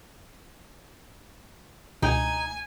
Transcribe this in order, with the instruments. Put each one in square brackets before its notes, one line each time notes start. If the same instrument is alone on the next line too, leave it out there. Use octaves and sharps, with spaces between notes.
[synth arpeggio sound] C#2 B2 [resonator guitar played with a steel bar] D#4 [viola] G#5